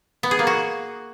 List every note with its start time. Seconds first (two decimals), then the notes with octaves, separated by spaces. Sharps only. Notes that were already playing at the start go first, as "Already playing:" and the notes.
0.23 B3
0.31 G#4
0.39 A#3
0.47 F#4